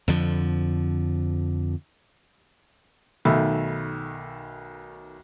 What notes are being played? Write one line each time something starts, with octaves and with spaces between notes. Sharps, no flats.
F2 D3 F3
B1 D#3 A3 E5 B5